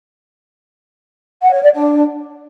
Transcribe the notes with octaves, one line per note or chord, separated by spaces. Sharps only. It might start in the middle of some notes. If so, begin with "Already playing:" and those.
F#5
C#5
D5
D4